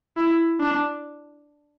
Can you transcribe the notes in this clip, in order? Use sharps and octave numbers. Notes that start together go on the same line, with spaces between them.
E4
D4